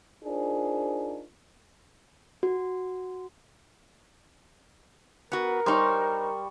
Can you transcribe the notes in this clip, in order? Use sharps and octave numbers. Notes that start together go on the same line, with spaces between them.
D4 D#4 F4 G#4 A#4 C5
F#4
B3 F#4 A#4
G3 D#4 C5 C6 C#6